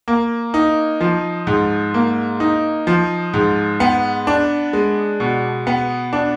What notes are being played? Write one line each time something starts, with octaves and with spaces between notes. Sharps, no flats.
A#3
D#4
F3
G#2
A#3
D#4
F3
G#2
B3
D4
G#3
B2
B3
D4